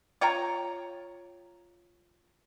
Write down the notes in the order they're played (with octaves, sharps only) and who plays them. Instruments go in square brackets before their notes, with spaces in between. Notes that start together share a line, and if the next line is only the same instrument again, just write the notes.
[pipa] F4 C#5 G5 A#5